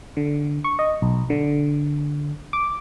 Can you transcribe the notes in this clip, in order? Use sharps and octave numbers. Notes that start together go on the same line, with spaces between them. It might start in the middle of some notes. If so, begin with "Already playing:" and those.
D3
C#6
D#5
B1
D3
D6